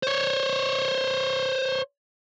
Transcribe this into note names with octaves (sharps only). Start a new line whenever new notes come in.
C5 C#5